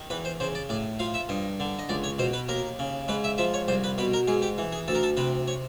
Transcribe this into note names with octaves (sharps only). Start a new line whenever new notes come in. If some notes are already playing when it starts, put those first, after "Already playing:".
Already playing: D#3
E2 B4
C5
C#3 C5
D5
A2 D5
F3 F5
E5
G2 D#5
D3
D#5
C#2 D5
C#5
B2 C5
B4
D#2 A#4
C#3
G#2 B4
E5
F3 E5
C#5
C2 C5
B4
B2 B4
A#4
G#2 G#4
G4
E3
G#4
D2 A4
A#4
A4
C3 B4
C#5